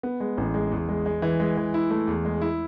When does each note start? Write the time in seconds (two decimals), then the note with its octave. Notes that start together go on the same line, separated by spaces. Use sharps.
0.03 B3
0.20 G#3
0.38 A1
0.54 G#3
0.71 E2
0.89 G#3
1.06 G#3
1.22 E3
1.40 G#3
1.57 E3
1.74 E4
1.91 A3
2.07 E2
2.25 G#3
2.41 E4